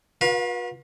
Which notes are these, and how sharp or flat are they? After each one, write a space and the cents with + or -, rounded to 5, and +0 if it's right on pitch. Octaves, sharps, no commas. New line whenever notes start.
F#4 -45 B4 -35 F5 +20